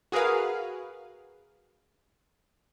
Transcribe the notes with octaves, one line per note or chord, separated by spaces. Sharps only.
F#4 G#4 A#4 B4 F5